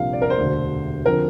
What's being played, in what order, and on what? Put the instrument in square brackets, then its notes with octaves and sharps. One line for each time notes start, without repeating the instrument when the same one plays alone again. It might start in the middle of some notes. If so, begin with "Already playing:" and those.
Already playing: [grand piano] C2 A#2 F3 A#3 D4 F5
D5
A#4
C5
E1 D2 D3
D3 F3 C4 A#4